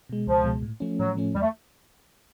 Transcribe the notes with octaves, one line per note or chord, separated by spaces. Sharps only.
B2 G#3
C#2 F3
B2 G#3
A2
F3 A3 C#4
A2 F#3
F3 A3 C#4
E2 G3
A3